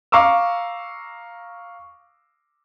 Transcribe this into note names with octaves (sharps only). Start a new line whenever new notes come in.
F5 A#5 C#6 D6 E6